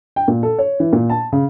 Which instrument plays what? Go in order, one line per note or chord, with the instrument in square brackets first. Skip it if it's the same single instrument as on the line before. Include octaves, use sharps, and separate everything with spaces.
[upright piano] G5
A#2
A4
C#5
E3
A#2
A5
C#3